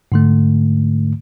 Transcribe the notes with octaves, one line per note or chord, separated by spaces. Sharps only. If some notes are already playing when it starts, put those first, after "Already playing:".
G#2 D3 A3